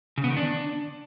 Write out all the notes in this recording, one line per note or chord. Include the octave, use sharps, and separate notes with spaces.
C#3
B3
D#3
D4